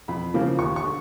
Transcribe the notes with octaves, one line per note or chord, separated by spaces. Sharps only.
F2 B5
C#3 F3 A#3
D#2 C#6
C#6
D3